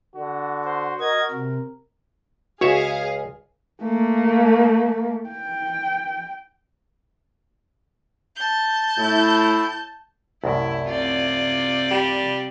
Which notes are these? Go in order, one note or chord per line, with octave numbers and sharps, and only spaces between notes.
D3 F#4
C5
A#4 D#5 G#6
C3
C#2 F#4 G#4 C#5 E5 F5
A3 A#3
G5
A5 G6
A2 E4
C2 F#2 A2 E4
C3 F4 D5
G3